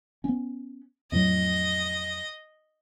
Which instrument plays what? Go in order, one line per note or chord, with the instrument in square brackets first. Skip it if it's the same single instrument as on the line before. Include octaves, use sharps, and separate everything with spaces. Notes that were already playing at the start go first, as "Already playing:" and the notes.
[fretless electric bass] B3 C#4
[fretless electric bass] F2 A2 F#3 [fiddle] D#5